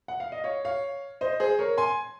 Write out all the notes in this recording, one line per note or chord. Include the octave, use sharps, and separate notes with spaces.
F#5
F5
D#5
C#5 F5
C#5 F5
C5 D#5
G#4 C5
A#4 C#5
G#5 C6